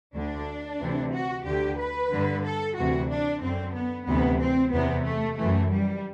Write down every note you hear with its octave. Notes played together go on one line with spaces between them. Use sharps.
D2 D3 D4
D2 C3 E3
F#4
D2 D3 G4
B4
G2 D3
A4
D2 C3 E3 F#4
D4
F#2 D3 C4
B3
D2 C3 E3 B3
C4
E2 C3 E3 B3
A3
F#2 E3 A3
G3